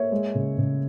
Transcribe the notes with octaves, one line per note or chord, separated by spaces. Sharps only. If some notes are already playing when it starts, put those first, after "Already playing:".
Already playing: A#3 C#5 E5
G#3
C#3
C#3